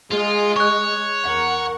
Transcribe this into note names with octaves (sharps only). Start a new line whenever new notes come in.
G#3 F4
C#5 C#6 F#6
E2 A#4 F#5